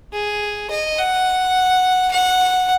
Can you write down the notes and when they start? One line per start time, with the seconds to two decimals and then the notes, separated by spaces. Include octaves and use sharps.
0.13 G#4
0.70 D#5
0.98 F#5
2.11 F#5